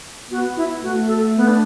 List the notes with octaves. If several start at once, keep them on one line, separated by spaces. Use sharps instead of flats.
B3 F#4
E4
A3 F#4
A4
B3
D4